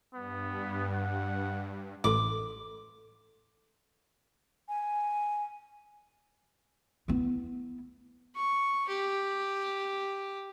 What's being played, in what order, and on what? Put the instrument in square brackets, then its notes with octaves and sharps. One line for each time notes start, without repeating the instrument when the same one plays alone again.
[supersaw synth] G2 [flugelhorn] B3
[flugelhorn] F#5
[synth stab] A1 [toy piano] A4 C6 [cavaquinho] D6
[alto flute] G#5
[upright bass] B3 E4
[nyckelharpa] C#6
G4